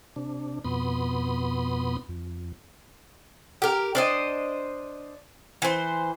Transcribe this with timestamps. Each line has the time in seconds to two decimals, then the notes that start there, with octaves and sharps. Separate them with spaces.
0.16 C3 D4
0.64 F2 B2 B3 B5 C6 D#6
2.09 F2
3.62 G4 A#4
3.95 D4 C5 D#5
5.62 E3 C5